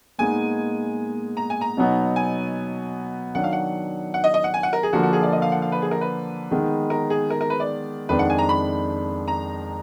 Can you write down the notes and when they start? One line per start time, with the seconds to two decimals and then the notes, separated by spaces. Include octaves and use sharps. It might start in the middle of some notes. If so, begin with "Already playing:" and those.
0.18 A#2 G#3 B3 D#4 G#5
1.37 A#5
1.50 G#5
1.61 A#5
1.77 B2 F#3 B3 D#4
2.16 G#5
3.35 D#3 F#3 D4 F#5
3.44 F5
3.53 F#5
4.14 F#5
4.24 D#5
4.34 D#5
4.44 F#5
4.54 G#5
4.63 F#5
4.73 A#4
4.83 G#4
4.93 D3 F3 A#3 F#4
5.03 F#4
5.13 G#4
5.23 D5
5.33 D#5
5.42 F5
5.52 F#5
5.62 F5
5.72 B4
5.82 G#4
5.91 A#4
6.01 B4
6.51 D#3 G#3 B3 D#4
6.90 A#4
7.10 G#4
7.30 A#4
7.41 A#4
7.50 B4
7.60 D5
8.09 F2 D#3 G#3 D4 B4
8.19 F#5
8.30 G#5
8.38 A#5
8.49 B5
9.28 A#5